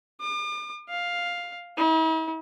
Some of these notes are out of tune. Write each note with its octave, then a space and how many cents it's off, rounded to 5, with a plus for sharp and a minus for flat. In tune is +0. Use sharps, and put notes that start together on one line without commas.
D6 +45
F5 +5
E4 -45